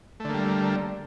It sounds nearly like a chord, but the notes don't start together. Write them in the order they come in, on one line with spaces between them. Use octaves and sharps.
A3 D3 A#3 G3